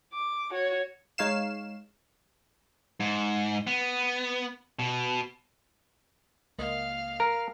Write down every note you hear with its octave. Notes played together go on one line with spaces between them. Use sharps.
D6
F#4 C#5
G#3 D#4 C#5 F5 C7 E7
G#2
B3
B2
C#2 A#3 D#5 F5
A#4